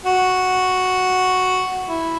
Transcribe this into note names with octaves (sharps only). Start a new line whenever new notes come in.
F#4
E4